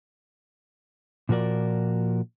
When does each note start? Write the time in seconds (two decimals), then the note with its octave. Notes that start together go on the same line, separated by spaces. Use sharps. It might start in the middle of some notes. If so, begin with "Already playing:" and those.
1.29 A#2 F3 F#4 A#4 D5